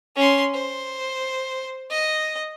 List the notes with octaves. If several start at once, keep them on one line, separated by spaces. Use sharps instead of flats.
C#4 C6
C5
D#5